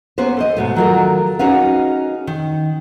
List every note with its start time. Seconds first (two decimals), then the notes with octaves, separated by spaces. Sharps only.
0.18 A#3 B3 C#4 B4 C5
0.37 A4 C5 D#5
0.57 G#2 B2 A3
0.76 D#3 F#3 G#3 F4 A4 A#4
1.39 C#4 D#4 F#4 G#4 B4 F5
2.27 D#3